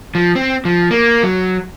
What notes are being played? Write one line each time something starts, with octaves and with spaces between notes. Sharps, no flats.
F3
C4
F3
A#3
F#3